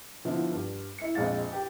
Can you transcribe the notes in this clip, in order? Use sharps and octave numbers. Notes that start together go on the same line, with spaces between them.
D3 F3 B3 D4 E4
G2
E4 C#7
A#1 F2 G#3 F5 A6
G4 G5